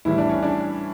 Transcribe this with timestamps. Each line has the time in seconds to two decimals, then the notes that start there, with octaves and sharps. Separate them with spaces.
0.05 A2 E3 G3 E4
0.18 D4
0.29 C#4
0.43 D4